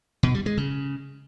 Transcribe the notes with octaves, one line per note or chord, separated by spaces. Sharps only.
B2
G3
G#3
C#3